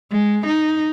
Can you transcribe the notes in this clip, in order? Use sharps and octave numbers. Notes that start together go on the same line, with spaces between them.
G#3
D#4